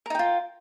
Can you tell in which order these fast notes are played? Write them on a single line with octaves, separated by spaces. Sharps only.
A#4 D#4 G5 F4